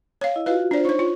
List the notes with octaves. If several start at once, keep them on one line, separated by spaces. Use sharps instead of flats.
C#5 F5
E4 D#5
F4 F#4 B4 F5
D4 F4 C5 D5
D#4 C5 C#5 C#6
F4